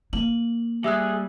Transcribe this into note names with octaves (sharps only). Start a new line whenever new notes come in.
A#3 F#7
G3 G#4 E5 E6 F#6